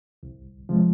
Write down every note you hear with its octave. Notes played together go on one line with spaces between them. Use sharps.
C2
C3 F3 G#3